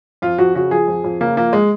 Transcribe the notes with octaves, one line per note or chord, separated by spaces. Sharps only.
F2 F4
F2 F#4
C#3 F#4
F3 G#4
F2
F2
C#3 A#3
F3 A#3
G#3